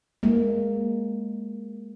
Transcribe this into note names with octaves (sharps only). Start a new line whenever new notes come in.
G#3 A#3